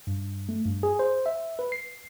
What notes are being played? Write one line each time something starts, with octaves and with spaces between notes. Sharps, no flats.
G2
A3
G2
G#4
C5
E5
B4
C7